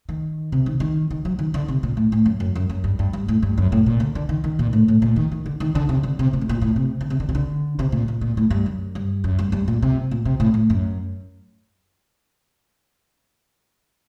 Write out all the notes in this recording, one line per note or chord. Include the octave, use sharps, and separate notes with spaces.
D#3
C3
D#3
D#3
D#3
F#3
D#3
D3
C3
A#2
A2
A2
F#2
F#2
F#2
F#2
G2
G2
G2
A2
G2
F#2
A2
A#2
D3
D3
D#3
D#3
A#2
A2
A2
A#2
D#3
D#3
D3
D#3
D3
C3
D3
C3
A#2
A2
A#2
A2
C3
D3
C3
D3
C3
D3
C3
A#2
A#2
A#2
A2
G2
F#2
G2
F#2
G2
G2
A#2
C3
A#2
C3
A2
A2
F#2